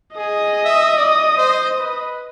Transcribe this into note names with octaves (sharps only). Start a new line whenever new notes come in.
G#4 D#5 D#6
E5
D5
C5
B4